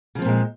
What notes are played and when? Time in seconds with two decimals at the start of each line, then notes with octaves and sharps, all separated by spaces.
0.15 C#3
0.18 F3
0.22 C4
0.25 A#2
0.28 G#3